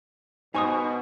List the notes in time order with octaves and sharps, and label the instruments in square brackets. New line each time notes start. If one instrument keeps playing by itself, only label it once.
[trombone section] B2 [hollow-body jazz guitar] D#4 C5 D#5 [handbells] G#5 C#6 D#6